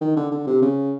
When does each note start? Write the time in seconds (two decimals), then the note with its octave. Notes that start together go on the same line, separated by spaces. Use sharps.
0.01 D#3
0.17 D3
0.31 D3
0.47 C3
0.62 C#3